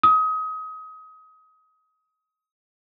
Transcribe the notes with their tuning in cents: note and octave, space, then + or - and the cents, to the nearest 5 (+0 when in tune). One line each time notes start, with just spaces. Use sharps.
D#6 +25